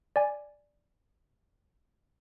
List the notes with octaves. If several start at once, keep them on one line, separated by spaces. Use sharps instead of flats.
D5 G#5